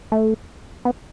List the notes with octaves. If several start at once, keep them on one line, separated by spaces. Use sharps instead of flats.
A3
B3